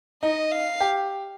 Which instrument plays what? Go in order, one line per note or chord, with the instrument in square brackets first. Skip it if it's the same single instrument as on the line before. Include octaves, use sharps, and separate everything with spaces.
[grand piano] D#4 [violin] D#5
[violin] F5
[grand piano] G4